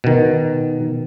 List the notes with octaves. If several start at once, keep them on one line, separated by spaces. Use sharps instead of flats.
B2 D#3